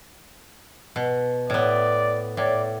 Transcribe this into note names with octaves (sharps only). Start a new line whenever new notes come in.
B2
A2 B3 D5
A2 D5